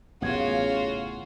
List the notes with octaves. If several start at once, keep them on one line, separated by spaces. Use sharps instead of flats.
A1 F#2 C#3 B3 F4 F#4 G#6